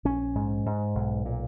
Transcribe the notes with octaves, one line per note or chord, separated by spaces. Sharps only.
A#1 C#4
G#2
G#2
B1
A#2